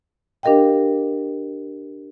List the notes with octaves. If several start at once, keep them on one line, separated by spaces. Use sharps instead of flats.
D4 G4 A#4 D#5 F5 G5